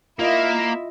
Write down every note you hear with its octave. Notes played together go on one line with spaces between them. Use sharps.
A#3 E4 F4 D#5 E5